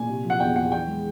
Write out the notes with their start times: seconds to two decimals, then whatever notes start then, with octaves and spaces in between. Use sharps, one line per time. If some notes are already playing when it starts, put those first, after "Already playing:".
Already playing: A#2 G#5
0.09 C3
0.24 F3
0.30 F#5
0.40 E2 G5
0.56 E2 F#5
0.72 E3 G5
0.88 G#3